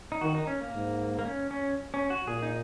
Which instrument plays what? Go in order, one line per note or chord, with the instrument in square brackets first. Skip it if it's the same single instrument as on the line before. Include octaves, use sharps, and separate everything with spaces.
[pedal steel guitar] D#4
[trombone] D#3 [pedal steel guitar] F#4
[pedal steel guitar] D#4
C#4
A#3
[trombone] G#2
[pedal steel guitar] A#3
C#4
C#4
C#4
F#4
[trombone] A#2 [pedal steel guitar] G#4
[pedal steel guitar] D#4